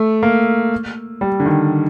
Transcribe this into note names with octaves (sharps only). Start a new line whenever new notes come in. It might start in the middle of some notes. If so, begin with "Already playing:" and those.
Already playing: A3
A#3
G3
D3
D#3